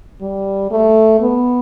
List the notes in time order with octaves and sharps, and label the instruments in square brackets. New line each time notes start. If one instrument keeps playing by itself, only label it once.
[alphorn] G3
A3
B3